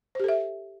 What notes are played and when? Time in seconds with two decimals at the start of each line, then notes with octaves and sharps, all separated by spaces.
0.15 C5
0.20 G4
0.24 A4
0.28 E5